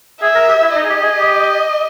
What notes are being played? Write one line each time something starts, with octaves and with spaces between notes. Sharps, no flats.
G#4 E5
A#4
G4
E4
D#4 D#5
G#4
G4
G#4
G4